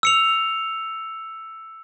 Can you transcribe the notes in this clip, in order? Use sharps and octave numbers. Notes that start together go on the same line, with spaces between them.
E6 C#7 F7